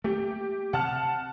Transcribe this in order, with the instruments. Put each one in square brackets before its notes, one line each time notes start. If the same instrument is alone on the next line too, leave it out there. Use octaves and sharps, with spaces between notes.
[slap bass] A3 A#3 [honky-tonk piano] G4
[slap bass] C3 [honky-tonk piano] F#5 A5 F6